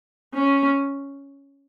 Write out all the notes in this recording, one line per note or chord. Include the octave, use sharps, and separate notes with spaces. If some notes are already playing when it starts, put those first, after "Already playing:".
C#4